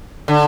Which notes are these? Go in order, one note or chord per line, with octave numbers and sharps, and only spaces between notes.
D3